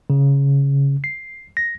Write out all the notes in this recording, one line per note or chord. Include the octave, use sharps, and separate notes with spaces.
C#3
C7
A#6